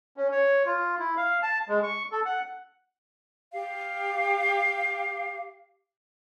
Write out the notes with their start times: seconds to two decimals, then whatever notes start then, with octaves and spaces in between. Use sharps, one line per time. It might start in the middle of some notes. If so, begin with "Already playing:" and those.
0.17 C#4
0.31 C#5
0.66 F4
0.99 E4
1.17 F5
1.43 A5
1.68 G#3
1.83 C#6
2.12 A4
2.25 F#5
3.54 G4 F5